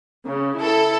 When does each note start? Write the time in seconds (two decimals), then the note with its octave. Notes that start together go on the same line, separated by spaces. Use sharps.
0.24 C#3
0.57 E4 A4